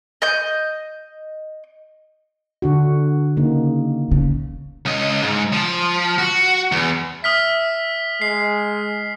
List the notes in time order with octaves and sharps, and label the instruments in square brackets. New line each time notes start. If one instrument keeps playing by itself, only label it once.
[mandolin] D#5 G6
[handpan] D3 D4 F#4
C#3 A#3 D#4
[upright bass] C#3
[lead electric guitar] C#2 D#5
G#2
F3
F#4
E2
[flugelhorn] E5 [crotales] D#6 F6 B6
[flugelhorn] G#3 [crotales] C7